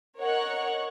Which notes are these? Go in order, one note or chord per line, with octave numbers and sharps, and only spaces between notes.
A#4 C#5 D#5 F#5 C#6 F#6